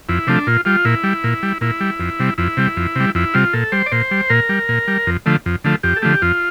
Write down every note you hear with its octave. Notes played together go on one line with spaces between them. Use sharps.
F2 E4
C3 F3 A3 D4
A#2 F4
G3 F4
A#2 E4
G3
A#2
G3
A#2 E4
G3
F2
C3 G3
F2 E4
C3 G3
F2
C3 G3
F2 E4
C3 G3 F4
A#2 A4
G3 C5
D5
A#2 C5
G3
A#2 A#4
G3
A#2
G3
F2
D3 F3 A3
F2
D3 F3 A3
F2 G4
A4
D3 F3 A3 G4
F2 F4